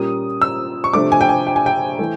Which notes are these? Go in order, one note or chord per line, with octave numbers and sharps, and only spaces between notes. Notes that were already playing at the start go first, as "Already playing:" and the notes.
Already playing: A#2 G3 A#3 C#4 D#6
E6
C#6
C3 F3 A3 D4 D6
G#5
G5
G#5
G5
G#5
G5
E3 A3